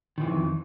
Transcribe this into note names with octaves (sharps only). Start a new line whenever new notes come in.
F2 D#3 E3